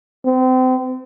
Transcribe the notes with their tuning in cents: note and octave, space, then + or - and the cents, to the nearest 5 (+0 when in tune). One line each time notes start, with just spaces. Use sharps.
C4 -35